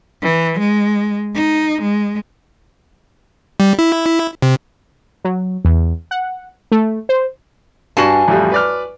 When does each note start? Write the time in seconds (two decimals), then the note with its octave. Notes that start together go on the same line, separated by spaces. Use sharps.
0.22 E3
0.59 G#3
1.35 D#4
1.81 G#3
3.60 G3
3.79 E4
4.42 C3
5.25 F#3
5.65 E2
6.11 F#5
6.72 A3
7.09 C5
7.97 G2 F#4 G#5 A5
8.28 A1 F2 G3
8.52 B4 D5 F6